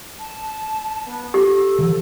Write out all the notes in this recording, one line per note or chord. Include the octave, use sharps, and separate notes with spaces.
A5
B3
G4 A4
E3 F3